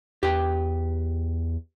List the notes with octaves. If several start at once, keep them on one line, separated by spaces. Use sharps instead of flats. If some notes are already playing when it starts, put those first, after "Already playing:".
E2 G4 B4 G5